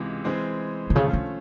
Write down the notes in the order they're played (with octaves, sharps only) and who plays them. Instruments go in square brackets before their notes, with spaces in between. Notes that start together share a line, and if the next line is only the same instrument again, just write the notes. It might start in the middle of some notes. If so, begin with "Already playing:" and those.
Already playing: [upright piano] C#2 C3 E3 G#3
E3 G#3 C4
[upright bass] C3
[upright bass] C#3 [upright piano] F3 A3 C#4 F4
[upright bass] D3